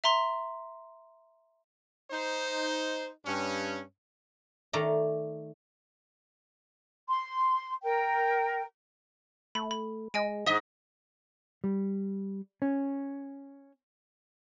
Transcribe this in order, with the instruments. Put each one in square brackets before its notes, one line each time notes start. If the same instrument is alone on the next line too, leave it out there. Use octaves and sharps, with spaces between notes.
[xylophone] E5 A#5 C6
[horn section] D#4 C5
G2 C#4
[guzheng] D#3 A3 D5 A#5
[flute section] C6
A#4 G5
[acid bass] A3 [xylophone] B5
[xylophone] B5
[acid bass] G#3 [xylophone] D#5 G#5 D7
[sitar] G#2 D#5 [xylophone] D#6 B6
[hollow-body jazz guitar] G3
C#4